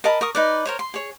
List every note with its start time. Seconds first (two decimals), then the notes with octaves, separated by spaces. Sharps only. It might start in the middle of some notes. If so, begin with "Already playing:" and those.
0.04 A#4 D#5 A5 B5
0.21 A#4 C#6 D#6
0.35 D#4 B4 D5
0.65 A#4 C5 C#5
0.79 C6
0.94 G#4 C#5